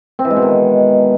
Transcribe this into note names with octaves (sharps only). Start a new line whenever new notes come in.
C4
E3
G#3
B2
D#3